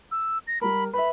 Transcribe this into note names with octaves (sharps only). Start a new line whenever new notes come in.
E6
A#6
G3 A#4 B5
B4 E5 B5